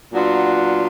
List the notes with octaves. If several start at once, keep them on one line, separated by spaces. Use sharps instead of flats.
A#2 F#3 B3 D4 F4